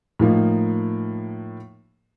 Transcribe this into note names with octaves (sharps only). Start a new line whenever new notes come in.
A2 F3 A#3 D#4